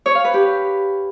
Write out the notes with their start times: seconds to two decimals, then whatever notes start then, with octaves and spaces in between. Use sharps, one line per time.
0.06 C#5
0.15 F5
0.24 B4
0.34 G4